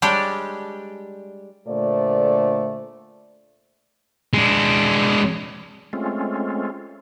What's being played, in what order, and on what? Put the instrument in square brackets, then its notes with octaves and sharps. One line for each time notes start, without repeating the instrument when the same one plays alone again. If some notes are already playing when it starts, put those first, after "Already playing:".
[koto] G3 G#3 D4 G4 C#5 D5
[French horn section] A#2 D3 A3 C5 D5
[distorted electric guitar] G#3 D4
[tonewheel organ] G#3 A3 C4 C#4 F4